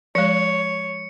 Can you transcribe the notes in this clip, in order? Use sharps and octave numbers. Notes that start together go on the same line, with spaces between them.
F3 G#3 C#5 C#7